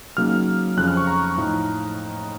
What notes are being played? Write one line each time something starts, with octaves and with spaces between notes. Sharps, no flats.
C#3 F#3 A#3 D#4 F6
F2 C#3 F3 F#6
F6
C#6
A#5
A2 F3 A3 D#4